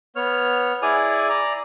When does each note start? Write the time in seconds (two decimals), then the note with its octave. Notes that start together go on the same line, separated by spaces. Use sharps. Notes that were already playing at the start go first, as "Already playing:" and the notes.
0.16 B3 C#5 F6
0.82 E4 G#4 D5 G#5 D#6
1.29 D5 A#5